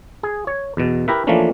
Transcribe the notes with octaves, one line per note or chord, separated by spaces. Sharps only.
G#4
C#5
E2 B2
E4 G4 A#4 B4 E5
E3 F3 A3 A#3 C#4 D4